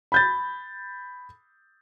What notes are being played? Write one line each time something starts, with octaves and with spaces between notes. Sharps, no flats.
B5 G6 A6